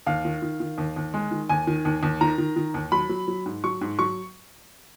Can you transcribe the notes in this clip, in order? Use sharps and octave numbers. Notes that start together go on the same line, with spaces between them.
D#2 F5
D#3
D#3
D#3
D#2
D#2
G#3
D#3
D#2 G#5
D#3
D#2
D#2
D#3 A#5
D#3
D#3
D#2
F#3 B5
F#3
F#3
G#2
F#3 C#6
G#2
F#3 C#6